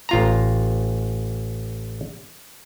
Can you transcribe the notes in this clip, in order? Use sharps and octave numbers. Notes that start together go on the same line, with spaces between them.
A1 F4 A#5